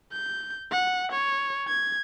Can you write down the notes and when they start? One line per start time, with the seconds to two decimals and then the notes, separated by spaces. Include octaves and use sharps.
0.13 G6
0.71 F#5
1.12 C#5
1.68 G#6